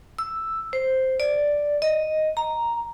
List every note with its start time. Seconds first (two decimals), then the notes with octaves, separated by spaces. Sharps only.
0.19 E6
0.73 C5
1.20 D5
1.82 D#5
2.37 A#5